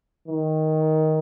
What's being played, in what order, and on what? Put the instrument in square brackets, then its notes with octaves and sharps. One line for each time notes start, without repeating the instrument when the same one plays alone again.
[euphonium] D#3